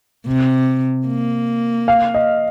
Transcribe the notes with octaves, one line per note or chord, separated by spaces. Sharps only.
C3
A#3
F5
D#5